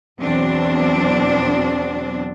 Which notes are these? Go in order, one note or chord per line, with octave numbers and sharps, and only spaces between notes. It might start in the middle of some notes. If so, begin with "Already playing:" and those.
E2 B2 F#3 C4 D4